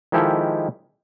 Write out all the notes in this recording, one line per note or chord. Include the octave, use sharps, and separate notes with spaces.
D#3 F3 G#3 E4 G4 A4